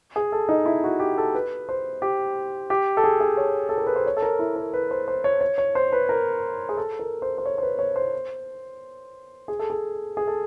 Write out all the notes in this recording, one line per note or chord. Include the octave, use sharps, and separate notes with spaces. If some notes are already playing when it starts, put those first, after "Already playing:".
G#4
A4
D#4
E4
F#4
G4
A4
B4
C5
G4
G4
A4
G#4
G#4
C#5
A4
A#4
B4
C5
C#5
A4
A#4
E4
A#4
B4
C5
C5
C#5
C#5
C#5
C5
B4
A#4
G#4
A4
A#4
C5
C5
C#5
C5
B4
C#5
C5
G#4
A4
G#4
G#4
A4